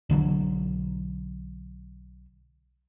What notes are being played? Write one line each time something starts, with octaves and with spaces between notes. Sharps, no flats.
B1 D3 E3 F#3